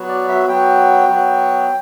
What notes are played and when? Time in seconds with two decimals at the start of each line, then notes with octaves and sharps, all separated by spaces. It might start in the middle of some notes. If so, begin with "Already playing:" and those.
Already playing: F#3 B3 F#4
0.08 D5
0.28 E5
0.48 F#3 B3 F#4 G5
1.09 F#3 B3 F#4